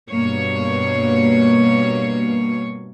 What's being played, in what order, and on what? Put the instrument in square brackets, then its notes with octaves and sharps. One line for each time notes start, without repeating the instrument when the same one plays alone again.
[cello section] G2 B2 A#3 C#5